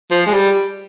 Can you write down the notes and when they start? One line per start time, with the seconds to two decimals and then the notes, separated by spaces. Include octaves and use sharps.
0.11 F3
0.26 G#3
0.33 G3